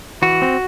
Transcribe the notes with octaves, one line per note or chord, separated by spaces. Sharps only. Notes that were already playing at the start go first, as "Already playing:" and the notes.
E3 F#4
C4